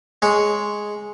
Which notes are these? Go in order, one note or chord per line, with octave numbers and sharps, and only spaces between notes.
G#3 C#5